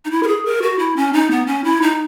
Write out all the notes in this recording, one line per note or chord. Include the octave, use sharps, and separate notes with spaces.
D#4
E4
A#4
G#4
A#4
F#4
E4
C#4
D#4
B3
C#4
E4
D#4